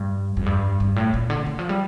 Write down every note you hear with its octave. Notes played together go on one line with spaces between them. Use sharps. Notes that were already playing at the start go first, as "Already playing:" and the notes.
Already playing: G2
F2
G2
G2
A2
A#2
D3
D#3
F3
G3